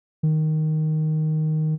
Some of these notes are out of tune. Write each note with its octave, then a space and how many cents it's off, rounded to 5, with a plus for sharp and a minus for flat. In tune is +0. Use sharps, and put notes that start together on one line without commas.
D#3 +0